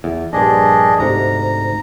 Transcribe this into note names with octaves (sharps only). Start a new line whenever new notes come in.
E2
A#1 G2 D4 G#4 D#5
D2 G#2 C3 A#5